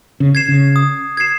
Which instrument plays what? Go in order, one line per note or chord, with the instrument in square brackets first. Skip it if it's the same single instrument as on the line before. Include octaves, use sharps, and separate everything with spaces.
[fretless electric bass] C#3
[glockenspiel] G#6 C7 E7
[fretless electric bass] C#3
[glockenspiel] D#6
G#6 C7 E7